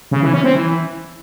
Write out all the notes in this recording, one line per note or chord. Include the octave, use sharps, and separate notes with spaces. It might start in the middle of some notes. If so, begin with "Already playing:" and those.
C#3
E3
C#4
C4
E3